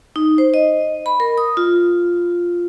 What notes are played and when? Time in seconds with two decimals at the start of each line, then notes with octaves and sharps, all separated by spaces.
0.16 D#4
0.38 C5
0.54 D#5
1.06 B5
1.20 A#4
1.38 D#6
1.57 F4